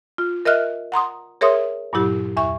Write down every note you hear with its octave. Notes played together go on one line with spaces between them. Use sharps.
F4
A#4 D#5 E5 F6 F#6
F#5 A#5 C6 D#6
G#4 A#4 C#5 E5 C6 D#6
G2 A#2 F#3 E4 G4
E2 E5 C#6